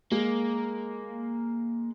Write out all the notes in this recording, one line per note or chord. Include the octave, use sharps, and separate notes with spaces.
G#3 A#3